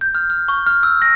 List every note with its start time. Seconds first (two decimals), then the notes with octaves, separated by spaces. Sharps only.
0.01 G6
0.15 F6
0.30 F6
0.48 C#6
0.66 F6
0.83 E6
1.02 A#6